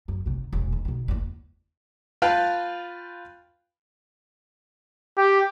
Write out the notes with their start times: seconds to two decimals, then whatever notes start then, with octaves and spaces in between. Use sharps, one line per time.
0.08 F#2
0.26 D#2 C3
0.53 E1 A#1
0.72 D#3
0.85 B2 D#3
1.08 D#2 E3
2.22 F4 B4 F5 G5 A5 B5
5.18 G4